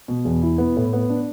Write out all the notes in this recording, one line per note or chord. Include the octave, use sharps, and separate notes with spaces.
B2
E2
E4
B3
A2
B3
D4